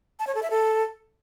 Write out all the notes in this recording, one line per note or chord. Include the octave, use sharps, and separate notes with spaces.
A5
C#5
A4
E5
A4